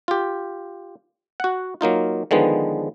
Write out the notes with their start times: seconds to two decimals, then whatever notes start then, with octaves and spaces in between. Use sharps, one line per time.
0.08 F4 G4
1.40 F#4 F#5
1.81 F#3 A#3 D#4 F4
2.31 D3 D#3 F3 G#3 B3